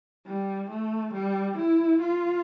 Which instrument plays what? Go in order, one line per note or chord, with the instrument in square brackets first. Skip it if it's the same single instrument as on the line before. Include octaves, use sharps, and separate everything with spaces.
[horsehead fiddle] G3
A3
G3
E4
F4